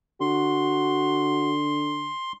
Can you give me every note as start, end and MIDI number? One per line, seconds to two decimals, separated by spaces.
0.21 2.11 50
0.21 1.54 66
0.21 2.32 84